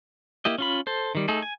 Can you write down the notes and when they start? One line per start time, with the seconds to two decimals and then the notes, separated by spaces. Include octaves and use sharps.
0.45 A#3 E4 G4 D#5
0.58 C#4 F4 B5
0.87 A4 C5
1.15 D#3 G3
1.28 A3 D#4 G#4 A4
1.42 G#5